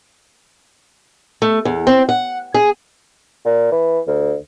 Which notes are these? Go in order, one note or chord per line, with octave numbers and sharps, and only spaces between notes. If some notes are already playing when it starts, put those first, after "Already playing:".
A3
E2
C4
F#5
G#4
A#2
E3
D2